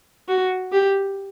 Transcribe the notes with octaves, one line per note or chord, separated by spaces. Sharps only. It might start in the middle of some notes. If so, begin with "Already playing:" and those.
F#4
G4